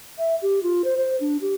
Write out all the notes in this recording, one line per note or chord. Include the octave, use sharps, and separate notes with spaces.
E5
G4
F4
C5
C5
D4
G4